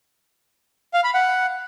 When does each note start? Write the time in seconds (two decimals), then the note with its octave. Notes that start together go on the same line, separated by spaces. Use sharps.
0.94 F5
1.04 B5
1.14 F#5